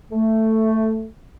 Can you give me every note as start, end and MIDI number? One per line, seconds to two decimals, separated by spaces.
0.11 1.06 57